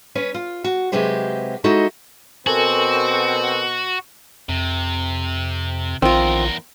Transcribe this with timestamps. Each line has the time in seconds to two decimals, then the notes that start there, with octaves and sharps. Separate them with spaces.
0.15 C#4 B4 C#5
0.34 F4
0.64 F#4
0.92 C3 F#3 G#3 G4 B4 C5
1.64 G#3 D#4 E4 F#4 A4 D#5
2.47 B2 C4 F#4 A4 A#4 G#5
4.49 F2 C3
6.02 A#1 E2 D#3 C4 F4 A#4